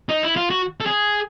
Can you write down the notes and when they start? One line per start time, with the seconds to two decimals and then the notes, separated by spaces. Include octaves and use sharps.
0.09 D#4
0.23 E4
0.36 F4
0.50 F#4
0.81 A4
0.86 G#4